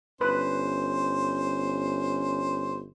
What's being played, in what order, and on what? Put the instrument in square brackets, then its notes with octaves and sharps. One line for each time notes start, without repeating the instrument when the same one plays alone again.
[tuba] G1 [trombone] C#4 [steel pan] B4 [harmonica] C5